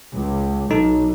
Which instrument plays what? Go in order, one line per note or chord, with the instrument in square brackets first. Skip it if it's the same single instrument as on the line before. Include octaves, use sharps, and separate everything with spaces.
[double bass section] C#2
[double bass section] B1 [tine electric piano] D#4 A4